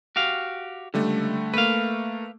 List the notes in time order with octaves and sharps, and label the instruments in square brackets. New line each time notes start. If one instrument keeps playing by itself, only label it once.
[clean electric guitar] F#4 G4 F5
[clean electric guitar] C#2 [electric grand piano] D3 G3 A3
[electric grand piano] A3 A#3 [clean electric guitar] B4 F5